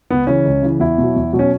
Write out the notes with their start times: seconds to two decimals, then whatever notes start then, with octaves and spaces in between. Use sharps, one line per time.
0.10 C#2 B3
0.27 C#3 E3 C#4
0.45 C#2
0.63 C#3 E3
0.79 E2 E4
0.98 B2 F#3
1.16 E2
1.33 B2 F#3
1.39 C#4